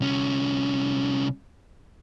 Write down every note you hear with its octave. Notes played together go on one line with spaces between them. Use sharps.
C2 C#4